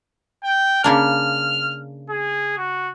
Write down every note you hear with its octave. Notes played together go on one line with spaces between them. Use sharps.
G5
C#3 A#3 D4 F6
G#4
F#4